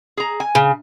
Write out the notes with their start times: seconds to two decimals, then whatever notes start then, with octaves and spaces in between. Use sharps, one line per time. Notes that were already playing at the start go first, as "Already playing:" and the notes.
0.17 G#4 A#5
0.40 G#5
0.55 C#3